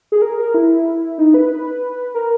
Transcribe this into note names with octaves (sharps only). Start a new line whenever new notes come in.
G#4
A#4
A#4
E4
D#4
B4
A#4